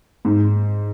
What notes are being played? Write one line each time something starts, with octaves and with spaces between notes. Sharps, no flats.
G#2